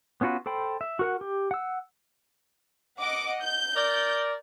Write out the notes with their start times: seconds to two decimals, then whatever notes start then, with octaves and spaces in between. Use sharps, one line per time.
0.21 B3 C#4 F4 F#4 B4
0.46 A4 C5 G5 B5
0.81 E5
0.99 F#4 A#4 F#5
1.21 G4
1.51 F#5 E6
3.00 D#5 F#5 D6
3.42 G6
3.75 A#4 D5